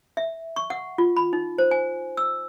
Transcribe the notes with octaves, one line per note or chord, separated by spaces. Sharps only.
E5
C#6
F#5
F4
B5
D#4
C5
G#5
E6